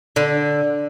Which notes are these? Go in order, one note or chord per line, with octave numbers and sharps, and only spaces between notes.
D3